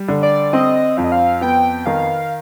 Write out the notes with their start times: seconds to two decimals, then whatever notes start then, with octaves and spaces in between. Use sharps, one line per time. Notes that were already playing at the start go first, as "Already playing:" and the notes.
Already playing: G3
0.08 D3
0.22 D5
0.53 C4 D#5
0.97 F2 F5
1.04 D#5
1.12 F5
1.41 B3 G5
1.86 D#3 F5